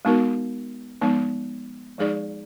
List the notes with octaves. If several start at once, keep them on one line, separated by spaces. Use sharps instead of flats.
G#3 B3 D#4 F#4 A#4
F3 G#3 B3 D#4
F3 G#3 D#4 G#4 D5